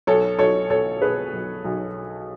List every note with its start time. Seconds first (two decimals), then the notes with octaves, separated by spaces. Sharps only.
0.07 B1 A4 C#5
0.39 B1 A4 C#5
0.70 B2 A4 C#5
1.01 B2 G#4 B4
1.33 B1
1.64 B1